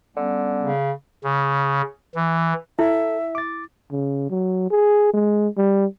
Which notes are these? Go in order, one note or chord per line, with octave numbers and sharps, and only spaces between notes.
D3 G3 B3 C#4
C#3
C#3
E3
E4 A4 E5
D6 A6
C#3
F#3
G#4
G#3
G3